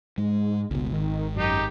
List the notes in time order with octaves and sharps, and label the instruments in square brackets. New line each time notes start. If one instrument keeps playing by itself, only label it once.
[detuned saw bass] G#2 [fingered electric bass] G#3
[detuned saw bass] G1 [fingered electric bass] C#2 B2
[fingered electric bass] G#1 [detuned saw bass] D#3
[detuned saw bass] F#2 [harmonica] D#4 G4